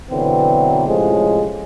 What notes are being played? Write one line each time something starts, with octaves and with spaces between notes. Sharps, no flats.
B2 D3 E3 F#3 C4
A2 C3 F3 G#3 C#4